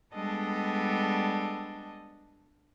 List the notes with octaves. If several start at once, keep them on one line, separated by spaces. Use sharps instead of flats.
G3 G#3 B3 D4 A4 D#5